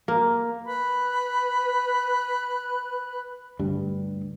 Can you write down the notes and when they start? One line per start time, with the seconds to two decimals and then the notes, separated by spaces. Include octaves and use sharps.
0.08 A#3
0.67 B4 B5 F#6
3.59 D2 G2 G3